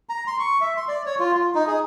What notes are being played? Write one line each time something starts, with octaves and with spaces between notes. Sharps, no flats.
A#5
C6
C#6
E5
C6
D5
C#5
F4
F4
D#4
G#4